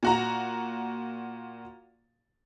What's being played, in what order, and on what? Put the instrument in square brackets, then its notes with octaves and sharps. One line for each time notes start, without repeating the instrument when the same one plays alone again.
[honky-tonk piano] A#2 F#4 A#5